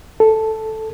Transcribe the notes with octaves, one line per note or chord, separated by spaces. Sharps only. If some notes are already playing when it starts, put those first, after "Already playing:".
A4